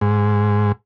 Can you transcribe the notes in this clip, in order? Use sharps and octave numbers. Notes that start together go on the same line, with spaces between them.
G#2